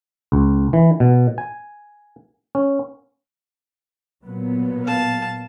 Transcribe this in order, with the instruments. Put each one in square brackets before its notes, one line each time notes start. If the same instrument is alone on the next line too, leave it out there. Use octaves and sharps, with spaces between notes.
[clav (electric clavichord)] C#2
E3
B2
G#5
C#4
[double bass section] A#2 F#3 B3
[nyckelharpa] F5 A5